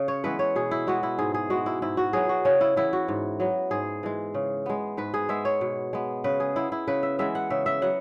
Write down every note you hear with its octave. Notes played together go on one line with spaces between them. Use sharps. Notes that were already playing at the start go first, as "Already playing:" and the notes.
Already playing: C#3
C#5
E3 G#3 B3 B4
C#5
B2 G#4
E4
G#3 B3 F#4
E4
G#2 G#4
G#4
G#3 B3 F#4
E4
G#2 E4
F#4
F#3 B3 G#4
F#4
C#3 C#4
E4
E3 B3 E4
F#4
G#2
F#3 B3
G#2 G#4
E3 G#3
C#3
G#3 B3
G#2 B4
G#4
G#3 B3 E5
C#5
B2
G#3 B3
C#3 B4
G#4
G#3 B3 E4
E4
C#3 B4
E5
E3 G#3 B3 E5
F#5
C#3 E5
E5
F#3 B3 F#5